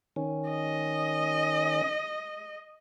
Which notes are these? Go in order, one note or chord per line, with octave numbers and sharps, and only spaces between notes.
D#3 C#4
D#5